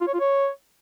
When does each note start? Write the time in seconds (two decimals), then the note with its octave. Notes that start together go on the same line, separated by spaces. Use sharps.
0.01 F4
0.07 C#5
0.14 F4
0.20 C#5